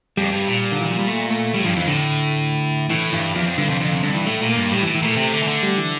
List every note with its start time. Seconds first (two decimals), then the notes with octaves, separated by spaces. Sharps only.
0.17 F2 G3
0.32 G2
0.47 A#2
0.72 D3
0.81 E3
0.90 F3
0.99 G3
1.08 A3
1.31 A3
1.54 A2 G3
1.64 G2 F3
1.76 F2 E3
1.87 A2 D3
2.90 A2 E3
3.12 G2 E3
3.35 E2 F3
3.47 F2
3.58 G2 D3
3.69 F2 C3
3.81 F2 D3
3.92 C3
4.03 G2 D3
4.14 E3
4.26 A2 A3
4.42 A#2
4.49 A#3
4.56 G2
4.71 A2 G3
4.83 E3
4.87 A2
4.95 E3
5.03 A#2 A3
5.17 C3
5.32 D3
5.43 E3
5.48 D3
5.63 G3
5.77 E3